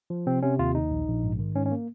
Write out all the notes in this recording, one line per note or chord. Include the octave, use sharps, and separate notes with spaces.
F3
C3 C4
C3 C#4
D#2 F4
D#2 D#4
A#1
A#1
G#2
D#3
G#2 C#4
C#4
A#3